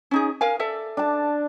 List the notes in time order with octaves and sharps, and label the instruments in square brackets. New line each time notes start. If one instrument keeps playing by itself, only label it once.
[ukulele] C#4 D#4 G#4
A#4 F5 G#5
A4 D5 E5
[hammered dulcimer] D4 A5